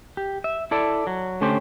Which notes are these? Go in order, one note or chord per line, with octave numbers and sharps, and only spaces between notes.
G4
E5
E4 A4 D5
F#3
D3 A3 C#4 G4 C5